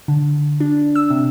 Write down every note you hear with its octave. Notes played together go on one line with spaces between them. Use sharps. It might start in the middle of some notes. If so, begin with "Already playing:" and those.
D3
D4
E6
C3